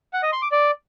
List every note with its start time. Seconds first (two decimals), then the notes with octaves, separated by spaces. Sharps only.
0.13 F#5
0.23 D#5
0.32 C6
0.42 D6
0.52 D5